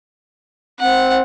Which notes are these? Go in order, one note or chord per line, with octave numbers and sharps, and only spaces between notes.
C4 F#5